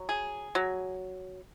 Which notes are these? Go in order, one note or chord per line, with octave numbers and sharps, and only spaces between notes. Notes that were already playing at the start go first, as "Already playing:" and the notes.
Already playing: F#3
G#4
F#3